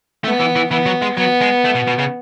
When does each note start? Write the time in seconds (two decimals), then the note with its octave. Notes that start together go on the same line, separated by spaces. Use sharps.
0.24 A3 B3
0.40 E3
0.56 E3
0.70 E3 B3
0.86 F#3
1.02 G#3
1.17 F#3 B3
1.41 G#3
1.64 A3
1.75 B2
1.87 B2
1.98 C#3